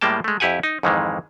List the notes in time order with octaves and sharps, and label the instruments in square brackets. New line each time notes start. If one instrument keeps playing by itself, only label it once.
[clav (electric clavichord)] A2 G3 G#3 A#3 G5 A5
G#3 A3
F2 E4 G4 F#5 G#5
D#4
F2 G#2 D#3 E3 G#3